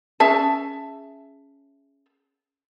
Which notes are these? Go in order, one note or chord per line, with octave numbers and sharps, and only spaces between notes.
C#4 G#4 E5 A5